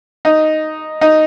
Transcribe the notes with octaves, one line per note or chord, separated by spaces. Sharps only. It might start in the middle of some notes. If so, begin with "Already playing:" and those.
D#4
D#4